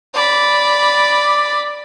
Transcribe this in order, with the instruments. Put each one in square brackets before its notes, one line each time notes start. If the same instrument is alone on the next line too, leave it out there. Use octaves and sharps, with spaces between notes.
[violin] D5 B5